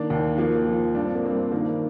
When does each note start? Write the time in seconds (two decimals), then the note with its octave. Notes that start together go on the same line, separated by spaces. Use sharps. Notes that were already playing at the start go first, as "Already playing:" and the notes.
Already playing: D#3 A#3 D4
0.10 D#2
0.38 F3 A#3
0.67 F3
0.95 G2 D4
1.05 C4
1.15 A#3
1.23 G2 C4
1.51 D#3 A#3 D4